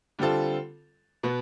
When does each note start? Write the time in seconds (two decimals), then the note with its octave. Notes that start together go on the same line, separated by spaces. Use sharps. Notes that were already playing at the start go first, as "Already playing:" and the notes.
0.19 D3 G3 C4 F4 A4
1.23 B2 B3